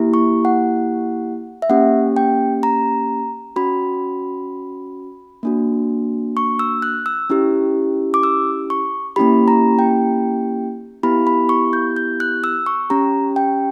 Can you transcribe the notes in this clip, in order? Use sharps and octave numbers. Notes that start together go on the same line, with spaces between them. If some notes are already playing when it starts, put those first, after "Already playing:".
Already playing: A#3 E4 G4
C#6
F#5
E5
A#3 C#4 G4 F#5
G5
A#5
C#4 F#4 B5
A#3 D4 F#4
C#6
E6
F#6
E6
C#4 E4 G4
D6
E6
C#6
A#3 C#4 E4 G4 B5
A#5
G5
B3 E4 G4 B5
B5
C#6
G6
G6
F#6
E6
C#6
C#4 G4 A#5
G5